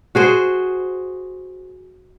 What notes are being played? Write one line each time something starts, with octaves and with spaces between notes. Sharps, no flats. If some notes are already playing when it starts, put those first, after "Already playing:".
F#4 G#4 C5